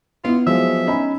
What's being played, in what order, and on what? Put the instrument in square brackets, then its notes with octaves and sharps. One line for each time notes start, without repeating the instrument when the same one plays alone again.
[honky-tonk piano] B3 E4 [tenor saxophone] F4
[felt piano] F3 F#3 G#3 [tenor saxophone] E5
[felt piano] C#4 D#4 B5